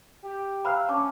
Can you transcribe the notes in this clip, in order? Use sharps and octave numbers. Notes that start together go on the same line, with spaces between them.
G4
C5 E5 F5 A#5 B5
C#4 A5 C#6 D6